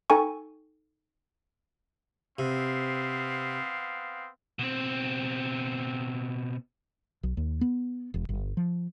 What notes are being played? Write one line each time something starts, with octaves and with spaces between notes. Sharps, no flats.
D#4 A4 G5 G#5 C#6
C3 B3 C4 F5
B2 C4
B1
D#2
B3
E1
G1
F3